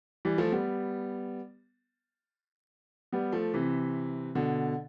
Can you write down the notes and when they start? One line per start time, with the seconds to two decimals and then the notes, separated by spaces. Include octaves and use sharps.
0.25 E3 G3
0.38 F3 A3
0.52 G3 B3
3.13 G3 B3
3.32 F3 A3
3.54 C3 E3
4.35 B2 D3